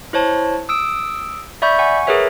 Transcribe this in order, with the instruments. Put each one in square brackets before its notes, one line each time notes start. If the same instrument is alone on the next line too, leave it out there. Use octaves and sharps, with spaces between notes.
[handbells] E4 C5 C#5 A5
D#6 E6 D7
D5 E5 B5 C#6 G6
F#5 G#5 C#6
G#4 A#4 B4 C#5 E5